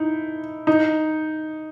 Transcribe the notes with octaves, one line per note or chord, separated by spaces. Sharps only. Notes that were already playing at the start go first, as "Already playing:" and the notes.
Already playing: D#4 E4
D#4